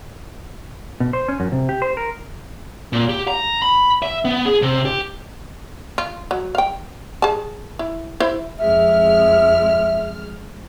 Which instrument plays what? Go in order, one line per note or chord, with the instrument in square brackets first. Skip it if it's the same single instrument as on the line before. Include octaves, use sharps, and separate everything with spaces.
[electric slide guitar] B2
C5
C#4
F#2
C3
G4
C5
A#4
[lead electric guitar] A#2
G4
A#5
B5
E5
B3
G#4
C3
G4
[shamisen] F4
F#3
F5 G5
G#4 A5
E4
E4 C5
[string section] F2 G#3 F6 [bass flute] E5